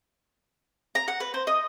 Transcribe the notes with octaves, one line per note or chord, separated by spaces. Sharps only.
A#5
F#5
B4
C5
D#5